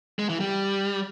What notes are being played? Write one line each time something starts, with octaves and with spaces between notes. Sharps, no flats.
G#3
E3
G3